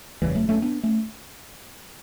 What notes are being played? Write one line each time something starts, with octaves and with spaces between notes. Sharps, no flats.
F#1 E2 C#3 E3 G3
F#3 A3
A3 C#4
B3 D4
A3 C#4